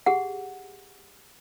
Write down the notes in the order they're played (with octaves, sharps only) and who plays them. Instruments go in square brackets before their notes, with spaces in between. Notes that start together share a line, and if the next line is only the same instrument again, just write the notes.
[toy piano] G4 G#4 F#5